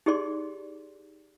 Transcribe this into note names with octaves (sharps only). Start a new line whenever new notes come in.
D#4 G4 G#4 D5 C6